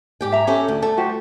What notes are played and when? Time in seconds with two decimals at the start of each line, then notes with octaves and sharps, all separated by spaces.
0.21 G#2 G4 G5
0.32 E5 A#5
0.47 C#4 G4 A4
0.68 D2
0.82 A3 A4
0.97 F#4 G4 C5